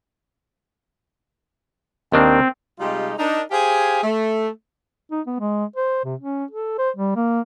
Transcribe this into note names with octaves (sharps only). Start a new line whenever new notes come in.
D#2 D#3 C4 D4
C3 G3 G#3 D#4 F4 G4
D4 D#4 A#4
G4 G#4 C5 F5 G#5
A3
D#4
B3
G#3
C5
C3
C#4
A4
C5
G3
A#3